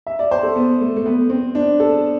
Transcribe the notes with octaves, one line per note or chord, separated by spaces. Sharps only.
E5
D5
C5
A4
B3
A3
A3
B3
C4
D4
A4